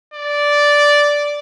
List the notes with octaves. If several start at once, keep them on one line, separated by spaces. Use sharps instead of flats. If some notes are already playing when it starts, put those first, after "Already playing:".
D5